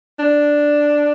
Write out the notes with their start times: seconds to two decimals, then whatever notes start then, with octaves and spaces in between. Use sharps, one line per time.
0.19 D4